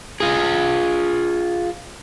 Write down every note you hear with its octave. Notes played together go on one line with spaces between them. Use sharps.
F4 G#4